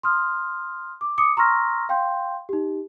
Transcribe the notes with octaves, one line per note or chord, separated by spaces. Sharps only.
C6 D#6 F6
D6
D6 D#6 C#7
A#5 C6 C#6 E6 F6 A#6
F5 G5 C6 G6
D#4 G4